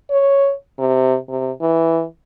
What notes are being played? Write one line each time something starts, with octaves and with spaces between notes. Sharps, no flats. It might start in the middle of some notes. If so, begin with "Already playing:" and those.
C#5
C3
C3
E3